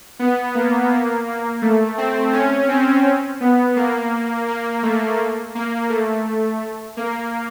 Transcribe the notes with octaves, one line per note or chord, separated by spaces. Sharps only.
B3
A#3
A#3
A#3
A3
C4
C#4
C4
B3
A#3
A#3
A3
A#3
A3
A#3